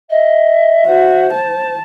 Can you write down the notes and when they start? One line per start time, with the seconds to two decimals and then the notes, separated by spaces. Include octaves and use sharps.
0.10 D#5 E5
0.87 F#4 C5
1.34 A5